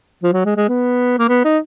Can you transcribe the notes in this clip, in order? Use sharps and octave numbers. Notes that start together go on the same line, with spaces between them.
F3
F#3
G#3
G#3
B3
A#3
B3
D#4